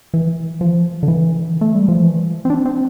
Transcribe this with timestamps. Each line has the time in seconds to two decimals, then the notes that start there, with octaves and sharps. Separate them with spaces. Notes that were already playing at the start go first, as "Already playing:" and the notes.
0.14 E3
0.61 F3
1.03 D3
1.08 E3
1.61 A3
1.75 G3
1.89 F3
2.02 E3
2.45 C4
2.50 D4
2.66 C4